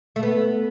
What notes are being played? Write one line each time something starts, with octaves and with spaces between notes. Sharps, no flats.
A3
B3